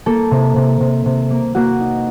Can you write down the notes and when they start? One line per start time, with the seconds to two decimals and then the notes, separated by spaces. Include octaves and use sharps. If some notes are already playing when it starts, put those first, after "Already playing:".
0.06 A#3 A4
0.31 C3
0.56 C3
0.80 C3
1.06 C3
1.30 A#3
1.55 A#3 F#4
1.80 D#4